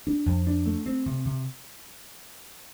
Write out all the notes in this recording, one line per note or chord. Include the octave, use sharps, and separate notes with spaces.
D4
F2
D4
A3
C4
C3
C3